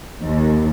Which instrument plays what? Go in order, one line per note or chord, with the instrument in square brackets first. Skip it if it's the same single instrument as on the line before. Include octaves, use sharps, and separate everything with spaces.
[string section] D#2